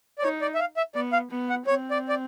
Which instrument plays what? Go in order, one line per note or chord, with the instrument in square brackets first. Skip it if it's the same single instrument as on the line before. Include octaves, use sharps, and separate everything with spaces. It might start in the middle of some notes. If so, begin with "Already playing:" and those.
[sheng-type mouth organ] D5
[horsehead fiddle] D#4 [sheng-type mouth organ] C#5
[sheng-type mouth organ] D5
E5
F5
E5
[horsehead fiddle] B3 [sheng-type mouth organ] D5
[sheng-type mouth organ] F5
[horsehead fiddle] B3
[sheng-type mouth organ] F#5
[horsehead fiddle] C4 [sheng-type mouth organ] C#5
[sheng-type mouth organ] D5
D5